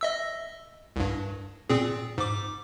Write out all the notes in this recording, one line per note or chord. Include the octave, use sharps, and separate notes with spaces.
D#5 E5 E6
C2 G2
A#2 C4 G#4
G#2 D6